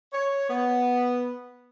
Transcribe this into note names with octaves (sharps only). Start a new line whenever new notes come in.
C#5
B3